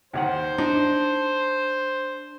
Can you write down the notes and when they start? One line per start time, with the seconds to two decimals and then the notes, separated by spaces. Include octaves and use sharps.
0.14 D#2 D#3 C5 F#5
0.58 D4 D#4